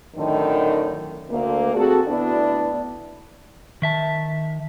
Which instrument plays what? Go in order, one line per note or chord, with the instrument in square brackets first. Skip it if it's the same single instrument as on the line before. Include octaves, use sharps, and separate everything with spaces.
[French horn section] F#2 A2 D3 D#3
D2 A#3
C4 F#4 G#4 A4
D2 B3 D4 E4 D5
[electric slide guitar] D#3 E5 A5